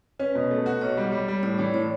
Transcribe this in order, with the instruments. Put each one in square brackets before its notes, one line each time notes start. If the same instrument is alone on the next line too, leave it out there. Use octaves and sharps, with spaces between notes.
[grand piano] C#4 [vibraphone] B4
[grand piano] B2
A3
F#4
[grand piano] B1 [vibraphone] C#5
[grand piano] G3
G3
G3
[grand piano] A2 [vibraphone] D5
[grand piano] E3 [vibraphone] C#5
[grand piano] A2 [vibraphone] C#5